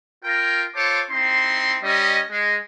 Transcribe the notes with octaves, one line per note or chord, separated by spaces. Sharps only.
F4 A#4 G5
F4 A4 C5 C#5 A5 D6
C4 D#4 E4 C6
G3 C#4 D#5
G#3